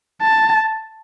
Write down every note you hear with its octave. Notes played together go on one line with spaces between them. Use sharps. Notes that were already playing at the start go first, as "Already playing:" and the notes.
A5